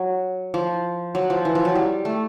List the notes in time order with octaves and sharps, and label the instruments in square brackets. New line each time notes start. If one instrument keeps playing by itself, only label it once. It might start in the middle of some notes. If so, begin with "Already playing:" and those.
Already playing: [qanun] F#3
F3
F#3
F3
E3
F3
F#3
G3
A3